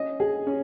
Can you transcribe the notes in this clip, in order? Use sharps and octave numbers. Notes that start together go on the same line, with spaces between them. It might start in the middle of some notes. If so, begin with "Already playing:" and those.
Already playing: C#4 D#5
G#4
C#4